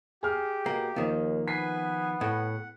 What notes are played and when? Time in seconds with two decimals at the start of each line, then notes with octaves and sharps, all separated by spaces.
0.23 G4 G#4 F6
0.66 B2 A#3
0.96 D#2 D#3 F3 A#3
1.48 B3 B4 G#5 B6 C7
2.21 A2 F#5